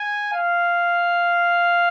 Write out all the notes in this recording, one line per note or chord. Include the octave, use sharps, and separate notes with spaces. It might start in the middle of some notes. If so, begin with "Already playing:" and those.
Already playing: G#5
F5